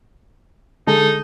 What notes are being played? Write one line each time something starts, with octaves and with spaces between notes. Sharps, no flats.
D3 G#3 D#4 A4